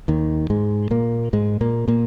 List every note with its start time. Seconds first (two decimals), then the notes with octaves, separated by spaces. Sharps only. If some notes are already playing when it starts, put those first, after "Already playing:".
0.08 D#2 D#3
0.50 G#2 G#3
0.91 A#2 A#3
1.33 G#2 G#3
1.61 A#2 A#3
1.88 A#2 A#3